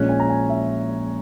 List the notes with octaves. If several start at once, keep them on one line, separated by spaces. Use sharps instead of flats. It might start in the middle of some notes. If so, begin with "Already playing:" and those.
Already playing: A#1 A#2 G#3 C#4 F#6
G#5
A#5
G#5
E5